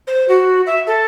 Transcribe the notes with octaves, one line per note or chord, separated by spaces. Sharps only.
C5
F#4
E5
A4